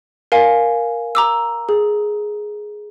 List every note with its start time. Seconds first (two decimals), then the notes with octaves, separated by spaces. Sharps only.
0.32 A#4 F5 G#5
1.15 A#5 D6 E6
1.69 G#4